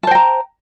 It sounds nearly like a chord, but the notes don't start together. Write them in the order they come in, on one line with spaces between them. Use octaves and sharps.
A5 C5 G5 A#5